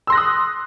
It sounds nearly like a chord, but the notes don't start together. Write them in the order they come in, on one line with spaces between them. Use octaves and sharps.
E6 C6 A#6 F#6 D#6